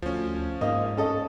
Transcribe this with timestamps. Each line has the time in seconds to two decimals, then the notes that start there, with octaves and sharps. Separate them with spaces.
0.02 D2 F3 C#4
0.61 G#2 A#3 D#5
0.97 C#4 A4 D#5